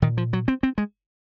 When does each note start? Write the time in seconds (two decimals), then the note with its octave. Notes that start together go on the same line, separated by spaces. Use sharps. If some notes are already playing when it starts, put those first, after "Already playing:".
0.02 A#2 D#3
0.17 F3
0.33 F#3
0.48 C4
0.63 C4
0.78 G#3